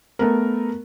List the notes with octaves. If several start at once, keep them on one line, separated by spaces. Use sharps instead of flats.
A3 B3 A#4